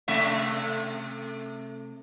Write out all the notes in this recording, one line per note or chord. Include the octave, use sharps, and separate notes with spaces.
C3 A3 E5